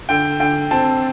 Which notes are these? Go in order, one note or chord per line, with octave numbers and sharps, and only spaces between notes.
D3 G5
D3 G5
C4 A5